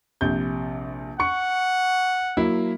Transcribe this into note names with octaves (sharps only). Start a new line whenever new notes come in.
A#1 C3 G6
F#5 C#6 C#7
F#3 A#3 E4